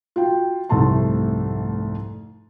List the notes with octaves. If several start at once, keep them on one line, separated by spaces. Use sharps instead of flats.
F4 F#4 G5
F1 C2 G#2 A3 A5 C6